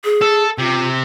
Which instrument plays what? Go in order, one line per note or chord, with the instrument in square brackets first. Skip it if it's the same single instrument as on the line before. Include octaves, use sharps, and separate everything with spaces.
[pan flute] G#4
[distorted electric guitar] A4
[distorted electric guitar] C3 [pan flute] F4